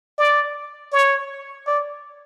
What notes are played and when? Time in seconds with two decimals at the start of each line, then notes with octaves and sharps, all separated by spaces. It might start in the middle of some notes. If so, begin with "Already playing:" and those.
0.18 D5
0.93 C#5
1.67 D5